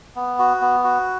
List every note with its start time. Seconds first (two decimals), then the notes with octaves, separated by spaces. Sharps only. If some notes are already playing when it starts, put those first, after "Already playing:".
0.16 B3
0.39 F#4
0.61 B3
0.84 F#4